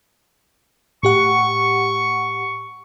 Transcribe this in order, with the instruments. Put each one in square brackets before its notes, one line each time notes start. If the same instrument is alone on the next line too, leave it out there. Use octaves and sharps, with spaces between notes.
[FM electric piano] A2 G4 F#5 [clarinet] C#6